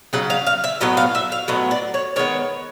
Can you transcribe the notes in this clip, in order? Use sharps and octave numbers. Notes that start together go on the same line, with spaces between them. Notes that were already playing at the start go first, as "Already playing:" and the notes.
C#3 F#3 F#5
F5
F5
E5
A2 F#3 B3 D#5
F5
E5
F5
A2 F#3 B3 D#5
D5
C#5
D#3 G#3 B3 C#5